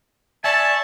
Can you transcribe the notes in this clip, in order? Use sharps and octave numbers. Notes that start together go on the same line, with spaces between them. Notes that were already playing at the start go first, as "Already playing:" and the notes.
D5 E5 G#5 A5 C#6